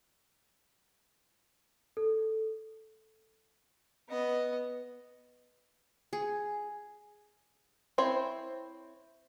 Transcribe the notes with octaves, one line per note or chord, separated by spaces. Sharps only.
A4
B3 D#5
G#4
C4 E4 C5 C#5